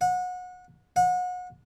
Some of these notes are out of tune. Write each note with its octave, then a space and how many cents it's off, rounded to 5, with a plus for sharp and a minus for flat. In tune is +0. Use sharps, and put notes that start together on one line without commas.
F#5 -30
F#5 -35